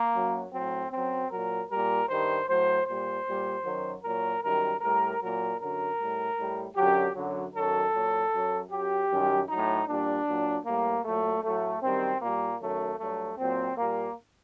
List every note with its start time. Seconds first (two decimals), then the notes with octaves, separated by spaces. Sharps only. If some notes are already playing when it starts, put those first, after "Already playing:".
Already playing: A#3
0.14 F#2 F#3
0.52 A2 F#3 C4
0.91 F#2 F#3 C4
1.30 A#2 F#3 A#4
1.69 A#2 G3 A#4
2.08 G2 D#3 G3 C5
2.47 A2 F#3 C5
2.86 A#2 G3 C5
3.25 A#2 G3
3.64 F#2 D#3 F#3
4.03 A#2 F#3 A#4
4.42 F#2 D#3 G3 A#4
4.81 A2 G3 A#4
5.20 A#2 F#3 A#4
5.59 F#2 D3 F#3 A#4
5.97 A2 G3
6.36 A2 G3
6.75 F#2 D3 F#3 G4
7.14 F#2 D3 F#3
7.54 F#2 D#3 F#3 A4
7.92 A#2 F#3
8.32 F#2 F#3
8.71 F#2 F#3 G4
9.09 F#2 D#3 G3
9.48 A2 F#3 D#4
9.87 A#2 G3 D4
10.26 A#2 F#3
10.65 A2 G3 A#3
11.04 A#2 F#3 A3
11.43 A2 F#3 A3
11.82 F#2 D#3 G3 C4
12.21 A#2 G3 A#3
12.60 F#2 D#3 F#3 A3
12.99 G2 F#3 A3
13.37 A#2 F#3 C4
13.77 A#2 G3 A#3